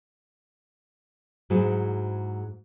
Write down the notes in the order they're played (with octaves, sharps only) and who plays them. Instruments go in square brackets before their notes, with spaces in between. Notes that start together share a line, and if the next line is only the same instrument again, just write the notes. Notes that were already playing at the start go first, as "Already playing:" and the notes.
[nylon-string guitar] G#2 F#3 E4 F#4 G#4